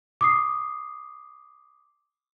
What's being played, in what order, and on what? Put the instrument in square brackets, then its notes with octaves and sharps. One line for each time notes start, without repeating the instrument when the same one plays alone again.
[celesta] D6 D#6 C7